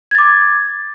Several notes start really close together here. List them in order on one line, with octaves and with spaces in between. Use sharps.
G#6 A6 D6